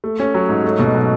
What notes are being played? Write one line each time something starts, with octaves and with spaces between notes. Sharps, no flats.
A3
C#4
F#3
G#2
A3
B2
F#3